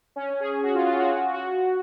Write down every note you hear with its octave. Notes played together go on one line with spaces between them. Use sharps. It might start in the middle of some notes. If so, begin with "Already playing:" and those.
C#4
G#4
F#4
F4
F4
F#4
F#4
F#4